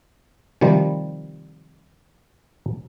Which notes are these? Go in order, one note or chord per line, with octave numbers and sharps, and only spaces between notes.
C3 D#3 F3 G3